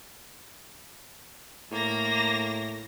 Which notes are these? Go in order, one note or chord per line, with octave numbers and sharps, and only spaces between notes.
A2 A#3 A#6